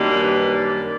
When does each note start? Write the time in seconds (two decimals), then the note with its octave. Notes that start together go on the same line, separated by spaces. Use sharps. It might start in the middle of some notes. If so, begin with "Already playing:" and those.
Already playing: F#2 D#3 G3 A#3 D4
0.22 B4
0.53 D5